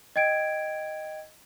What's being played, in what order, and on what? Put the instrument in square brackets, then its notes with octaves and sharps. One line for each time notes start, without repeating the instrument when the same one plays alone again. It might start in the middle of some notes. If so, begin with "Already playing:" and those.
[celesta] D#5 G5 G#6 D7